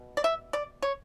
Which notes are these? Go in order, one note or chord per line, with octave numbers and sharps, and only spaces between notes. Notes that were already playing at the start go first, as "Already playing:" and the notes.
Already playing: B2
D5
E5
D5
C#5